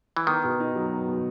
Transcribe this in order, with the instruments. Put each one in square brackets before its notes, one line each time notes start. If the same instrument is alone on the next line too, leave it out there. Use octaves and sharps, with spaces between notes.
[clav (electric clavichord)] E3
[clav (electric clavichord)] D#3 [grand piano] B3
[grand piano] B2
D#4
F#3
B3
B2